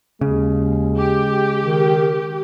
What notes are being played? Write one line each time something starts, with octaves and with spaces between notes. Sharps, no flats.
D#2 C#3 G#3
G4
D#3